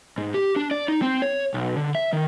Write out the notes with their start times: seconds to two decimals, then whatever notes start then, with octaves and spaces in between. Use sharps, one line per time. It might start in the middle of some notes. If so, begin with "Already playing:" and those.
0.18 G#2
0.34 G4
0.56 D4
0.71 D5
0.88 D#4
1.02 C4
1.22 C#5
1.54 B1
1.77 D3
1.95 E5
2.13 D#3